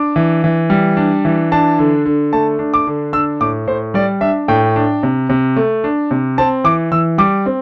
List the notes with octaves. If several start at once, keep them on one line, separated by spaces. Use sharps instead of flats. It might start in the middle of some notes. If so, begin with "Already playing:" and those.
Already playing: D4 D6
E3
E3
G3
D4
E3
D4 A5
D3
D3
A3 A5
D4
D6
D3
D4 E6
A2 D6
A2 C5
G3 D5
D4 E5
A2 G5
D4
C3
C3
A3
D4
C3
C4 A5
E3 D6
E3 E6
G3 D6
C4